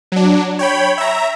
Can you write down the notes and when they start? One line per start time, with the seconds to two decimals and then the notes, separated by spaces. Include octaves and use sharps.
0.12 F#3 D4
0.59 C#5 G5 B5
0.98 E5 A#5